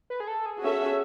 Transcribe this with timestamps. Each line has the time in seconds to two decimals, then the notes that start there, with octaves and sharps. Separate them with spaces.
0.10 B4
0.20 G#4
0.28 A4
0.46 G#4
0.63 C#4 F#4 A4 E5